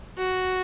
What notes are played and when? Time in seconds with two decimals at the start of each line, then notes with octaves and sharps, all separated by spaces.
0.18 F#4